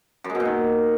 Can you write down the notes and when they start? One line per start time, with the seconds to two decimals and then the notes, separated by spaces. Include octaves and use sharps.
0.24 F#2
0.30 G#3
0.35 B2
0.40 A#2
0.45 D#3